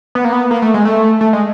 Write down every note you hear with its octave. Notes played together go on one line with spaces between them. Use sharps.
B3
A#3
B3
A#3
A3
G#3
A3
A3
G#3